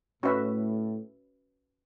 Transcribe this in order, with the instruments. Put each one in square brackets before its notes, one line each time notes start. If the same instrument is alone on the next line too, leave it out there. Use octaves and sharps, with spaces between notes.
[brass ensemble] A2 [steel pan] C#4 F#4 B4 E5